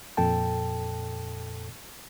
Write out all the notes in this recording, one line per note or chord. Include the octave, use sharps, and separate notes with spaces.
F2 A#2 A4 G5 A5